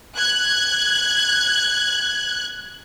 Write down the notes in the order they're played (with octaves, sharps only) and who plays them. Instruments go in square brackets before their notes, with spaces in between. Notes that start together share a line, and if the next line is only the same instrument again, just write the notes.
[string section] F#6 G#6